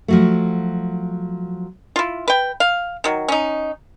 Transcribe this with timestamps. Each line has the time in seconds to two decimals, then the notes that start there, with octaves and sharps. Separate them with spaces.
0.08 F3 F#3 A3
1.96 E4 F4
2.28 B4 G5
2.60 F5
3.04 D#3 F#3
3.28 C#4 D#4